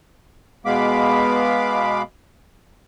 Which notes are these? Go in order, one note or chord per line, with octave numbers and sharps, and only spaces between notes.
B2 G#3 B3 F5 B5 D6